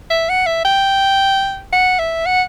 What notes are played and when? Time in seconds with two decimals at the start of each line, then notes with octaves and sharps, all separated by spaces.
0.10 E5
0.29 F#5
0.46 E5
0.65 G5
1.73 F#5
1.99 E5
2.26 F#5